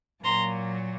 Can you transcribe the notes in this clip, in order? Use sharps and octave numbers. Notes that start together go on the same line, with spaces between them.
A#2 F#3 A#3 A#5 C6